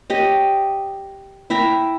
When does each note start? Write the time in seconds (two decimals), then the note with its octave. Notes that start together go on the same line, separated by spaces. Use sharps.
0.10 G4 C#5 D#5
1.50 E4 E5 G5 A#5